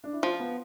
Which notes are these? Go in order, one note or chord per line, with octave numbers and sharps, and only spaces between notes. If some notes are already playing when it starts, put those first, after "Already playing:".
D4
E4
F3 F4
B3